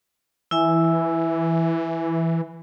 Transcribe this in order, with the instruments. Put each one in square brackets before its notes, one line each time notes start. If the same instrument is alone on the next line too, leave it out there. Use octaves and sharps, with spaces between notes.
[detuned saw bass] E3 [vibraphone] E4 E5 G#5